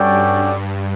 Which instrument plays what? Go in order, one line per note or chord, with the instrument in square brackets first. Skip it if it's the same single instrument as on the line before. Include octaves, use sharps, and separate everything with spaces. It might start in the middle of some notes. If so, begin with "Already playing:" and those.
Already playing: [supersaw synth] G2 [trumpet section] C#4 F#4 A4 D5 G5